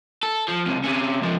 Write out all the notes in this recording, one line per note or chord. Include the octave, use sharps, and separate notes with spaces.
A4
F3
C#2 C3
C3 C#4
G#2 F3